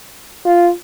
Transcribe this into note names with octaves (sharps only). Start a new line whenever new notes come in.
F4